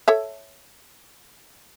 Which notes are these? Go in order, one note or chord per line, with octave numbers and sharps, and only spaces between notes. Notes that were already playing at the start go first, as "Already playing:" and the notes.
A4 C#5 E5